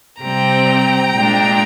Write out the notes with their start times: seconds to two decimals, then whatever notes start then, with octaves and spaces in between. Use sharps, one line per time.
0.20 C3 G3 C4 G5 A#5
1.13 A#2 G#3 D4